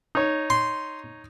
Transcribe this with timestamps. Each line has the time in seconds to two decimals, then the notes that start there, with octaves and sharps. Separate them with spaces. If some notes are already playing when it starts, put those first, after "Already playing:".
0.15 D#4 C#5
0.50 C6